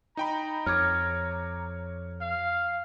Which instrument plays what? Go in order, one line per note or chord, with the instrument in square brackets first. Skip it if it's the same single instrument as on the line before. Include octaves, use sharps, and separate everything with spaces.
[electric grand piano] D#4 G5 B5 [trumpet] A#5
[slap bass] F2 [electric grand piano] C#5 D6 [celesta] F6 G#6
[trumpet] F5